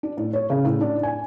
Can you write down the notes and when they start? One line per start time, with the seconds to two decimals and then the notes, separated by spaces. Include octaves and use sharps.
0.03 D4
0.17 A2
0.33 C#5
0.50 C#3
0.65 A2
0.81 D4
1.03 G#5